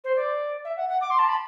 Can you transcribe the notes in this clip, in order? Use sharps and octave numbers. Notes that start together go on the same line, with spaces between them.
C5
D5
E5
F#5
F#5
D6
C6
A5
B5